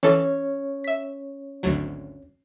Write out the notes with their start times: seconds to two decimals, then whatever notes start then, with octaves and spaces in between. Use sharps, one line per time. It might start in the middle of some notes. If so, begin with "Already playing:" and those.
0.03 E3 C#4 A4 C#5
0.84 E5 B6
1.63 G#1 D2 F#3